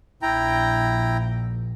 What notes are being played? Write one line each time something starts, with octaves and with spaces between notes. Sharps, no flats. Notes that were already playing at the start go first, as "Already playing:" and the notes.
A#1 E4 G5 A#5